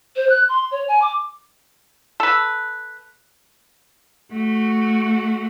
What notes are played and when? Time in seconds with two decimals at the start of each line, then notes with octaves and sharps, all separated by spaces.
0.16 C5
0.29 F#6
0.49 C6
0.71 C#5
0.88 G#5
1.02 D6
2.20 A4 B4
4.33 A3 F#4